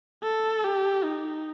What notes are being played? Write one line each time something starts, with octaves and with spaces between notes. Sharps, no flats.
A4
G4
D#4